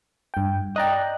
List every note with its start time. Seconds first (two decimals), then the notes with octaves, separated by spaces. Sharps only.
0.34 G2 G5
0.76 D5 D#5 G5 A#5 F#6